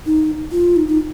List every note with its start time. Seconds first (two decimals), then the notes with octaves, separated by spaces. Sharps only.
0.06 D#4
0.52 F4
0.76 D#4
0.88 D#4